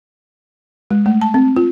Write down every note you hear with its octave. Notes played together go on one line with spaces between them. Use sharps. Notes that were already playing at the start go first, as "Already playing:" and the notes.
G#3
A3
A5
C4
F4